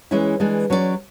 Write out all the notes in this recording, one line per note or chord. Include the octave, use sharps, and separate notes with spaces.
E3 G#3 C#4 E4
E3 G#3 D4
F#3 C#4 G#4 D5